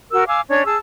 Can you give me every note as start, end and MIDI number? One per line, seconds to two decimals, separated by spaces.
0.10 0.24 66
0.10 0.24 70
0.10 0.24 88
0.27 0.41 77
0.27 0.41 80
0.27 0.41 86
0.27 0.41 88
0.49 0.63 61
0.49 0.63 62
0.49 0.63 73
0.49 0.63 92
0.66 0.77 68
0.66 0.77 81
0.66 0.77 88